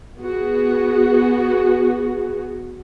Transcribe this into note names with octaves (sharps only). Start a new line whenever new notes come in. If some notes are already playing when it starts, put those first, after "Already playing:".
B3 F#4 G#4